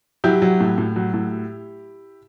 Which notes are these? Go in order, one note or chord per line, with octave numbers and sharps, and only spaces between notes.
F#3 E4 G4
F#3
A2
A2
F#3
A2